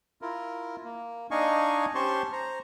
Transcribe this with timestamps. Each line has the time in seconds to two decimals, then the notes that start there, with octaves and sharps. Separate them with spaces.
0.22 E4 F4 A#4
0.84 A#3
1.31 D4 D#4 D#5 F5 G#5 C#6
1.95 C#4 G4 C5 A5 C6 C#6
2.32 C5 A#5